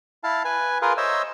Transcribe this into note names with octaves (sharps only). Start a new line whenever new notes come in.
E4 F5 A5
B4 G#5
F4 G#4 A#4 B4 F5
C5 C#5 D#5 E5 E6